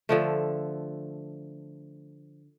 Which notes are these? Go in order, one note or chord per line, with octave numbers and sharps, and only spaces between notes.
D3 F3 A3